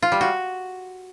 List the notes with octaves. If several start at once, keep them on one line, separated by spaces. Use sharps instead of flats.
F4
G3
F#4